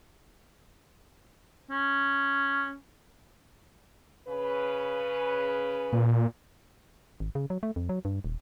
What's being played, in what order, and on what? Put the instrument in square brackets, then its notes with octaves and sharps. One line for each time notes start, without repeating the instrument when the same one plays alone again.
[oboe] C#4
[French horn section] C#3 B4
[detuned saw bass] A#2
[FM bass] G#1
C#3
F#3
A3
F2
F#3
G2
D#1